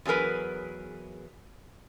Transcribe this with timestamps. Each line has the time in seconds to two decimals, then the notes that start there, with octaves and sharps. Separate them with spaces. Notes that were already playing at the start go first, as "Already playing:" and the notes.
0.05 E2 F#3 G#4 A#4 B4